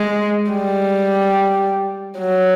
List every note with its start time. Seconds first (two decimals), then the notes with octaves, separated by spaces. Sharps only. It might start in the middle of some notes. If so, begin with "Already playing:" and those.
Already playing: G#3
0.52 G3
2.19 F#3